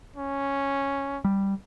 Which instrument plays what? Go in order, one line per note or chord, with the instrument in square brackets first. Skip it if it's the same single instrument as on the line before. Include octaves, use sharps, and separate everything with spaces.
[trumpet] C#4
[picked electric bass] G3